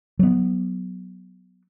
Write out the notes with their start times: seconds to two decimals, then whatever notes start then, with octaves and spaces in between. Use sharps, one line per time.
0.19 F#3 B3